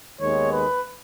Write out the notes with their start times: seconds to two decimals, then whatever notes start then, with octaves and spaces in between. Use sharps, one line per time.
0.20 D#2 D#3 G#3 B3 C#5
0.52 B4